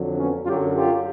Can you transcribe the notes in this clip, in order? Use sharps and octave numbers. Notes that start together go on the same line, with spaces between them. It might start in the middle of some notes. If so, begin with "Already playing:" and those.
Already playing: F2 D3 F#3
B3 C#4
F#2 D3 F#3 F4 G4
F4 G4